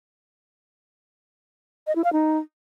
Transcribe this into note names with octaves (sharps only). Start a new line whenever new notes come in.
D#5
E4
F5
D#4